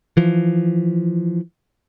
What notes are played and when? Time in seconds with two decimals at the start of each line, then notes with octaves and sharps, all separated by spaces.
0.17 E3 F3